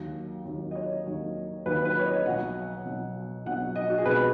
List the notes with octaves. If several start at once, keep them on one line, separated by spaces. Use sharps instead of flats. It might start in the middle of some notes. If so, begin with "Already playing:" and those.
Already playing: D#2 D#3 F#3
D#2 D#3 F#3
D#5
C#5
D#2 D#3 F#3
D#2 D#3 F#3 B4
B4
C#5
D#5
B1 B2 F#3 F#5
B1 B2 F#3
B1 B2 F#3 F#5
D#5
F#4
G#4
B1 B2 F#3 B4